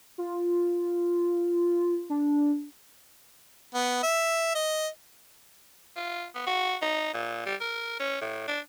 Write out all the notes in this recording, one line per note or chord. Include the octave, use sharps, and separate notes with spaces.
F4
D4
B3
E5
D#5
F4
B3
F#4
D#4
A#2
G3
A#4
C#4
A2
D4